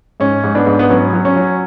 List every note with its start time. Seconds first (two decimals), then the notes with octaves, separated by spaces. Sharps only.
0.20 G#2 C#4
0.44 G#2
0.55 B3 D4
0.67 G#2
0.79 B3
0.89 F#3 C#4
1.13 F#3
1.25 C#4
1.36 F#3